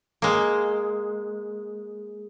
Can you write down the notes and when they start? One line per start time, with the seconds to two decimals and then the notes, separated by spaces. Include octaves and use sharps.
0.22 G#3 A#3